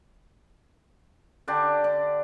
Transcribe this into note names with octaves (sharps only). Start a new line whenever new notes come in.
D3 D4 G4
D4